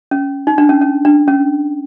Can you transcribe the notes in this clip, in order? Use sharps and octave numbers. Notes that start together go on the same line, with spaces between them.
C#4
D#4
D4
C#4
C#4
D4
C#4